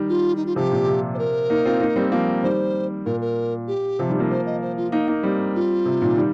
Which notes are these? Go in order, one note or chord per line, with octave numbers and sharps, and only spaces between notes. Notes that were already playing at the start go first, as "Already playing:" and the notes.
Already playing: D#3 G3
F4
D#4
F4
C3 F3 G4
A#2
C3
C5
A#4
A#3 D#4
C4 F4
A#3 D#4
G3 C4
F3 A#3
D#3 G3 C5
A#2 A#4
A#4
G4
C3 F3
D#3 G3
F3 A#3
C5
D#5
C5
F4
A#3 D#4
A#3 D#4
G3 C4
F4
C3
A#2 D#3
D#3 G3